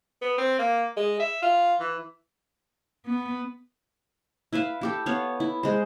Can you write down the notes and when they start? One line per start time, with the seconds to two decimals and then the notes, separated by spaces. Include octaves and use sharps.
0.22 B3
0.38 C4
0.58 A#3
0.96 G#3
1.20 E5
1.42 F4
1.80 E3
3.06 B3
4.53 E4 B4 E5 F5
4.81 E4 G4 A4
5.06 B3 C#5 F5
5.40 E4
5.63 G#3 C5